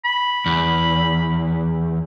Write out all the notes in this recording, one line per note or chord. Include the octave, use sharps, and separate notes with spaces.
B5
E2